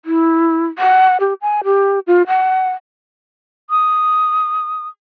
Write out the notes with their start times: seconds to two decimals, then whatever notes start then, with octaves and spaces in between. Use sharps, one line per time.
0.05 E4
0.79 F#5
1.20 G4
1.42 G#5
1.64 G4
2.07 F4
2.27 F#5
3.70 D#6